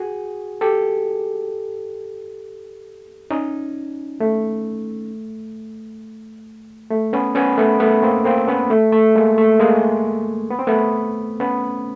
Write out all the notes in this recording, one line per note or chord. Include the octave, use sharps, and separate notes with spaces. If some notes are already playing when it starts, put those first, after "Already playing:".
Already playing: F#4 G#4
G4 A4
C#4 D#4
A3
A3
B3 C#4
B3 C#4
A3 B3
A3 B3
A#3 C4
A#3 C4
B3 C#4
A3
A3
G#3 A#3
A3
G#3 A#3
B3
C4
A3 B3
B3 C#4